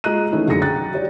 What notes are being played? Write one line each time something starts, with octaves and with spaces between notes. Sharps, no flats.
G#3 F4 D#5 A#5 F#6 D#7
D#3 E3 A3 C#4 D#4 E4
F#2 D3 G#4 A#6 C#7
G5 A#5 F#6 A6
F#3 G4 C#5 D5